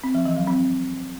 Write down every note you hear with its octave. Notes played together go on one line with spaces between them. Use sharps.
C4
F3
E3
F#3
C4